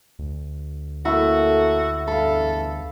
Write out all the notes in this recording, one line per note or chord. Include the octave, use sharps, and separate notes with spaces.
D2
A#3 E4 F#4 A4 C#6
E2 G2 A4 F5 B5